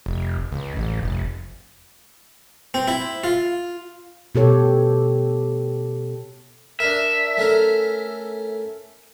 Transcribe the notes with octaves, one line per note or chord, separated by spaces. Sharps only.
F1
C#2
A1
F1
C4
E4
F4
B2 G4 A4 C#5
D4 A#4 E5
A3 C#4 A#4